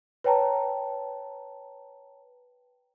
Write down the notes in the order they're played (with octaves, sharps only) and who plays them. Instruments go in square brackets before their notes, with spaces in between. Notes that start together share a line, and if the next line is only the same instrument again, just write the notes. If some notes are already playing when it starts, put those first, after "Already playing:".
[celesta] B4 C#5 G5 A5 A#5